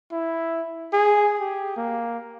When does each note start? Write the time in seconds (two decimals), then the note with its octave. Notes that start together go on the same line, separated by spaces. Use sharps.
0.12 E4
0.93 G#4
1.39 G4
1.77 A#3